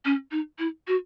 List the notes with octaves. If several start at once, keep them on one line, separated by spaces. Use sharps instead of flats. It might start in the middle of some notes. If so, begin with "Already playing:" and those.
C#4
D#4
E4
F#4